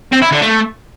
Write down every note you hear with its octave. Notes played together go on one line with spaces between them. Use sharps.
C4
E4
D3
A3